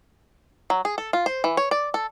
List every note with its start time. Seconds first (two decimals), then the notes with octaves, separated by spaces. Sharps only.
0.70 F#3
0.85 G#4
0.98 A4
1.13 F4
1.26 C5
1.44 E3
1.57 C#5
1.71 D5
1.94 A4